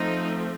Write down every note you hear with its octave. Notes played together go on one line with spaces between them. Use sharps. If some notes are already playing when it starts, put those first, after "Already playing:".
Already playing: F3 A3 C4 D#4